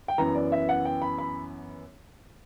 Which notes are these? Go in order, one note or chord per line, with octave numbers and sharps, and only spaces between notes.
G5
F#2 E3 B3 A#5
D5
E5
F#5
G5
B5
B5